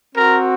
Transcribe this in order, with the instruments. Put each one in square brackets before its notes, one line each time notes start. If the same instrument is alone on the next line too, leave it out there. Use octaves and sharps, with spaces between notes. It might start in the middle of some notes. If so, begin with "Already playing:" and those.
[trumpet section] C4 F#4 A#4